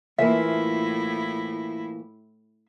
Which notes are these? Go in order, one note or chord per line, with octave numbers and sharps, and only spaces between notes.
A2 E3 F3 A#3 E4 E5